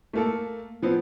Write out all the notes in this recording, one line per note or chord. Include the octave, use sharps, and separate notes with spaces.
A3 A#3 A4
F3 B3 C4